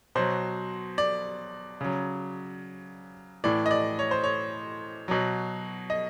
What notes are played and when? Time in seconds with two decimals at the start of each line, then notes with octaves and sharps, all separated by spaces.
0.15 B2 F#3 C5
0.98 D5
1.81 C#3 F#3
3.44 A2 E3 D5
3.66 D#5
3.71 D5
3.99 C#5
4.11 C5
4.24 C#5
5.08 B2 F#3
5.90 D#5